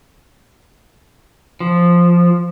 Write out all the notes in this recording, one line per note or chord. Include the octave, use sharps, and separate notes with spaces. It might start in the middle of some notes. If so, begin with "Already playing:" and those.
F3